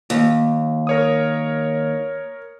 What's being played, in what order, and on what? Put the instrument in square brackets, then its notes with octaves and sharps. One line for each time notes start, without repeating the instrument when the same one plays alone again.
[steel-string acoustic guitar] D#2
[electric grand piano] A#4 C#5 D#6